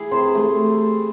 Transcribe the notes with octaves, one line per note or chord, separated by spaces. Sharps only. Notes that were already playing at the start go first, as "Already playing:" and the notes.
Already playing: E4 G#4
C3 C5
A3